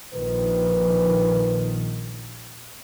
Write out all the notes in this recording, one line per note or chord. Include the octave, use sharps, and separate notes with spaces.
A#1 D#3 F3 B4